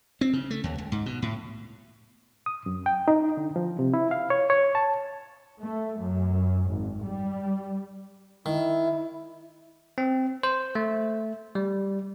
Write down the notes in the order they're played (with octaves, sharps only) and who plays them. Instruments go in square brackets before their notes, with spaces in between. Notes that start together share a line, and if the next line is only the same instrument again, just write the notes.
[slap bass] C4
C#3
A3
D#2
C#2
G#2
B2
A2
[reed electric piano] D#6
F#2
G5
D#4
D3
F3
C3
E4
F5
C#5
C#5
A5
[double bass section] A3
F#2
G#1
G3
[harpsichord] D#3 [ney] E4
[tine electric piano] C4
C5
A3
G3